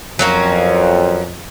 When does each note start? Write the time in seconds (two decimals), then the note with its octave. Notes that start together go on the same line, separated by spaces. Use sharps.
0.19 F2 F#3 A#3 C#4